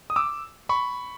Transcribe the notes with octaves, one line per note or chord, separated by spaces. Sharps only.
D#6
D6 E6
B5 C#6